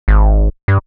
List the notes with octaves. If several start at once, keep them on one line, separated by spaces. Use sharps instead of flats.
G#1
G2